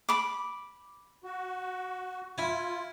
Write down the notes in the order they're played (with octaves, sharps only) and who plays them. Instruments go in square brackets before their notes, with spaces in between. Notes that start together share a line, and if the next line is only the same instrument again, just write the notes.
[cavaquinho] B5 D6
[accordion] F#4
[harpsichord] E4 G#5 [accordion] F4